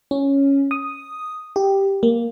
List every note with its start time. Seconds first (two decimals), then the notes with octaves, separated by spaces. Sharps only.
0.11 C#4
0.71 D#6
1.56 G4
2.03 A#3